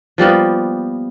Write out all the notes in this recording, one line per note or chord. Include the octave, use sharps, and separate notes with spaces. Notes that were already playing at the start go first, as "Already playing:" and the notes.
F3 G3 A#3 B3